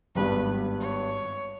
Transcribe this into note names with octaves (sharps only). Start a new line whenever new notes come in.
G#1 G2 G3 B3 G4 B4
C#5